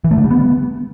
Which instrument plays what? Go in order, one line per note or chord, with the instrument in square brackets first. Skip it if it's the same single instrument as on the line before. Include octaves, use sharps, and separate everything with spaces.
[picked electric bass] E3
A3
D3
G3
B3